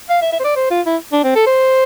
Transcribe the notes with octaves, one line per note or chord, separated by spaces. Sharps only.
F5
E5
E5
C5
D5
C5
F4
E4
D4
C4
A4
C5